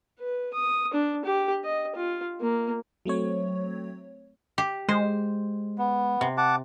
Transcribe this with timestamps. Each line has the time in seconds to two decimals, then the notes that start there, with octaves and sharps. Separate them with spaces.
0.19 B4
0.53 D#6
0.94 D4
1.25 G4
1.64 D#5
1.95 F4
2.41 A#3
3.05 F#3 A3 C4 C#5
4.58 G4
4.89 G#3 C5
5.78 B3
6.21 C3
6.37 F#5 A5 D6